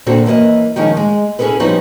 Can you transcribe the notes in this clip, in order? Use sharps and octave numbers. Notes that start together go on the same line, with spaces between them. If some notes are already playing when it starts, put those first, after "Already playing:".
A#2 D3 C4 F#4 A4
F#2 E3 A#3 D#5
D#3 F3 G#3 C#4 D#4
G#3
C#4 E4 G#4 A4 B4
F3 G3 B3 C#4 D#4 F#4